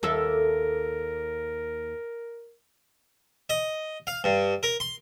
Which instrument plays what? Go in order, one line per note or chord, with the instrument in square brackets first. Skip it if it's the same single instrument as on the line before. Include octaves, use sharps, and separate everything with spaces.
[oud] D#2 A4 E5 [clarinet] A#4
[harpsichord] D#5
F5
G2
A#4
C6